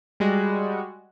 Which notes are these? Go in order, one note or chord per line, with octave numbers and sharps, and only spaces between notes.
G3 G#3 F#4